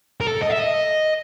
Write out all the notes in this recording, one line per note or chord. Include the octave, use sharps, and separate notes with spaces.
A#4
A4
D#5
E5
D#5